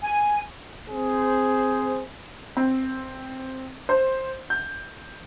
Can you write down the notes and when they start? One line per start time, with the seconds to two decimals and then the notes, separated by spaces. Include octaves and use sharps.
0.01 G#5
0.91 C4 G#4 C5
2.57 C4
3.89 C5
4.50 G6